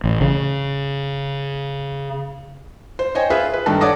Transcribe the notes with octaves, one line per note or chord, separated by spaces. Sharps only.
A1
C#3
C5
C5 C#5 D#5 G5 G#5
F4 G#4 B4 E5
B4
G2 D#3 A4 A5
C#5 D5 F#5 D6 D#6 A#6